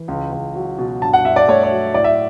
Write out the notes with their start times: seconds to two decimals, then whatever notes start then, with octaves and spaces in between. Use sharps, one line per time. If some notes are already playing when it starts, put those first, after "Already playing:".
Already playing: E3
0.08 C#2
0.32 C#2
0.55 F#3
0.78 B2
1.02 G2 A5
1.13 F#5
1.24 G2 E5
1.36 D5
1.48 A3 C#5
1.63 C#5
1.71 F#3
1.94 A2 D5
2.04 E5